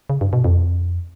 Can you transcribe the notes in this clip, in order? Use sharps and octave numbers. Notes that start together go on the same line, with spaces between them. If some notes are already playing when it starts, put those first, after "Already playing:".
C#3
G2
B2
F2